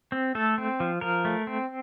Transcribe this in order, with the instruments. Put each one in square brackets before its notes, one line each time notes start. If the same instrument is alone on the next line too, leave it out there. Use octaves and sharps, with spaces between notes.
[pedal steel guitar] C4
A3 A4
C4
F3
F3 A#4
A3
C4